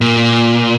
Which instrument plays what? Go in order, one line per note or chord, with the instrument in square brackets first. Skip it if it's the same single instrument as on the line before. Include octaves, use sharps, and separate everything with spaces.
[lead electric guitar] A#2